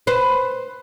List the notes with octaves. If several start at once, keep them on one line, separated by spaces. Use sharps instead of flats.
B4 C5